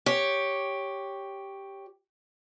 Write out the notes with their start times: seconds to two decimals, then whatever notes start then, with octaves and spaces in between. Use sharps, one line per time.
0.06 G4 C#5